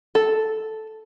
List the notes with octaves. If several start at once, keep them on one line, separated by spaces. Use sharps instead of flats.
A4